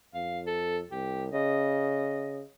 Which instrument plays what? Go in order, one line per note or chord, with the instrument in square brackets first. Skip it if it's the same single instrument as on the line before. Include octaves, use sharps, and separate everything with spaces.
[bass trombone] F2 [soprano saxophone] F5
[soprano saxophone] A4
[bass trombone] C2 [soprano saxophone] G4
[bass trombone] C#3 [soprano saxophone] D#5